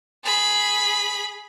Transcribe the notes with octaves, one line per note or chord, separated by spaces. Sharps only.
G#4 B5